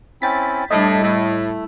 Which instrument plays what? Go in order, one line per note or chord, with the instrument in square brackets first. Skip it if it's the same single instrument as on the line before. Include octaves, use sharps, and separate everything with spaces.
[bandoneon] C4 C#4 E4 [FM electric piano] G5 A6 B6
[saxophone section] A2 [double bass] G3 D4 [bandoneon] A3 [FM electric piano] D#5
[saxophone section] A2 [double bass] E4